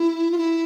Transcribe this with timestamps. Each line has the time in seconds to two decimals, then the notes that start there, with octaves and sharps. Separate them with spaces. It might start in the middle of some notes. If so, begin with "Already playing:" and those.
Already playing: E4
0.31 F4
0.38 E4